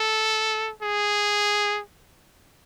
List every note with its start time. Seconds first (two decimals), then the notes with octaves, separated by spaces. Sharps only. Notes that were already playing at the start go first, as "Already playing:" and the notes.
Already playing: A4
0.82 G#4